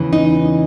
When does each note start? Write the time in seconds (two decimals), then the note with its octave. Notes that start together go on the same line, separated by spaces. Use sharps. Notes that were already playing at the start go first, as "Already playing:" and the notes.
Already playing: E2 C#3 E3
0.13 D#4